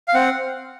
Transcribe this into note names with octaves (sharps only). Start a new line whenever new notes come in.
F5
C4 F#5